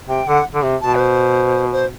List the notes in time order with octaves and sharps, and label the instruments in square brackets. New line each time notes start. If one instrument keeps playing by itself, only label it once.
[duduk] C3 [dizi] G5
[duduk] D3 [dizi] F#5
[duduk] D3
C3
[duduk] B2 [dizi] A5
[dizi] B4
C5
C5